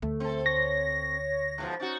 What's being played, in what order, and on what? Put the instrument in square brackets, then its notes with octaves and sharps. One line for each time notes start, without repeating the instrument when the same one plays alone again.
[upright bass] D2 [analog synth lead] A3
[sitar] C4 A4
[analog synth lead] C#5 [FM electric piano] A#6
[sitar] G#2 B2 F3
[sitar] C#4 D#4 F#4 [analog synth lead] A6